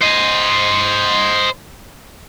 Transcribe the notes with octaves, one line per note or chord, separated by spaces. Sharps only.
C5 D#5